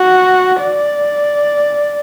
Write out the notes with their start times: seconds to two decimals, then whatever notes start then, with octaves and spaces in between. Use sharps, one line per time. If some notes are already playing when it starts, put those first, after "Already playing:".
Already playing: F#4
0.60 D5